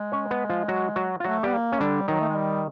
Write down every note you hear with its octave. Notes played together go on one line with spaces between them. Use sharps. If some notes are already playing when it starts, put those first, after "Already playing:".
Already playing: G#3
C#4 C#5
B3 B4
F3 F4
F#3 F#4
F#3 F#4
F4
F#3 A3 F#4
G3 B3 G4
A#3
C#4
D3 G3 D4
D#3 F#3 D#4
A3
G#3
G3